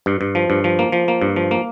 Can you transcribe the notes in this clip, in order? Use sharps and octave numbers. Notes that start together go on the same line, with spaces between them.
G2
G2
F3
G2
F3
A#3
F3
A#3
G2
F3
A#3